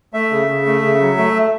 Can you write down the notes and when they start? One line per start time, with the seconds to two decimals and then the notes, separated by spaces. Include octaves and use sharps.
0.13 A3 E5
0.31 C#3
0.48 C#3
0.66 A3
0.82 C#3
1.00 F#3
1.17 A3